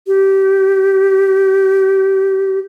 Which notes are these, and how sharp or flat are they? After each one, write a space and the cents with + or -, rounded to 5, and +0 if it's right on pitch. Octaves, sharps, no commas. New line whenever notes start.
G4 -25